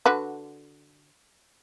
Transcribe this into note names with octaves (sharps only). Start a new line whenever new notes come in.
D3 F#4 B4